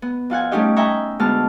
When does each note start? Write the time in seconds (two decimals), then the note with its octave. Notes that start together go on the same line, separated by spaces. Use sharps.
0.02 B3
0.30 F2 F4 F#5 G#5
0.51 G3 A3 C#4 D#4 G4 D#5
0.76 E5 G5 G#5 A#5 C#6 D#6
1.19 D2 G#3 B3 A5 F6